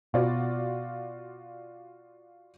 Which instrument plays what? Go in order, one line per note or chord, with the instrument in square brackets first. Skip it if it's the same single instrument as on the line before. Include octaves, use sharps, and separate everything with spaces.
[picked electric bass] B2 [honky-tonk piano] F4 F#4 D5